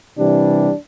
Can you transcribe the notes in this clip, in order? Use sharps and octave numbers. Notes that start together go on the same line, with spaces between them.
C3 E3 G3 D4